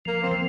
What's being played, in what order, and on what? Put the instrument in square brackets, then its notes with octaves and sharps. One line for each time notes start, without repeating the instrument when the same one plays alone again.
[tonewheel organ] F3 [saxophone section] A#3
[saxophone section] C4
[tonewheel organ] F3